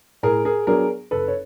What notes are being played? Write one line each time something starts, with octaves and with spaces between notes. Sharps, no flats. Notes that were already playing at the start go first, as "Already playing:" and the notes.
A2 G#4 A#4
G#4 A#4
F#3 B3 D4 G#4 A#4
F#1 A4 B4
C#5